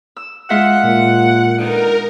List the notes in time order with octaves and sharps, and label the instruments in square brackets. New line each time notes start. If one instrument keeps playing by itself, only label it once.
[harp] E6
[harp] G#3 F4 E5 [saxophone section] F#5
[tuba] A#2
[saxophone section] D3 D#3 B3 [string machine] A#4